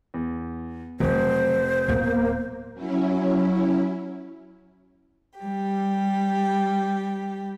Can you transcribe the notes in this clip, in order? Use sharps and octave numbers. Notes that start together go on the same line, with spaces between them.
E2
F1 C#3 F#3 C5
D1 A#3 B3
F#3 C#4 E4
G3 G4